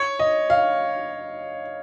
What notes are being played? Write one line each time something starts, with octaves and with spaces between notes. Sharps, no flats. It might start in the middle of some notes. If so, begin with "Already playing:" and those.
Already playing: C#5
D#5
F5